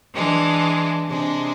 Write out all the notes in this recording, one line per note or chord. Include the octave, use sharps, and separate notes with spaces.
E3 G#3 D4
C3 G#3 D4